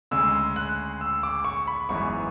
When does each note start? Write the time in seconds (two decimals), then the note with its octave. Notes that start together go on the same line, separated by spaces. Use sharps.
0.11 D2 C#3 G#3 E6
0.56 F#6
1.01 E6
1.23 D6
1.45 C#6
1.67 B5
1.89 G#1 F#2 E3 G#3 B3 C#6